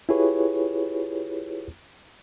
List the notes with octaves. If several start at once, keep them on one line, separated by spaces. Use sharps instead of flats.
E4 F4 G4 G#4 B4 C#5